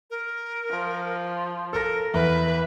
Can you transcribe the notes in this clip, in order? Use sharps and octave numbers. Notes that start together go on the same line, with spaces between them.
A#4
F3
A4 A#4 A#6
E2 B4 E5